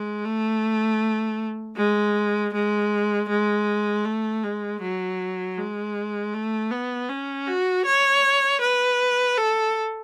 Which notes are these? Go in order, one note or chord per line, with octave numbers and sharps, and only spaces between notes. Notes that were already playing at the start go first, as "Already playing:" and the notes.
Already playing: G#3
A3
G#3
G#3
G#3
A3
G#3
F#3
G#3
A3
B3
C#4
F#4
C#5
B4
A4